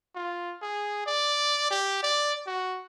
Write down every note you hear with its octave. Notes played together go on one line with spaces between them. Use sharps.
F4
G#4
D5
G4
D5
F#4